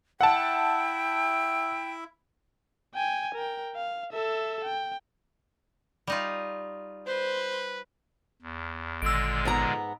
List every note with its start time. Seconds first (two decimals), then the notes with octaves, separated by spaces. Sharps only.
0.21 E4 E5 F#5 G5 A5
2.95 G5 G#5
3.35 A#4 G5
3.76 F5
4.13 A4 E5
4.65 G5
6.07 G3 D#4 F4
7.07 B4 C5
8.42 E2
9.02 G#1 A#2 D3 G#3 E6 D7
9.45 G#2 B3 A#5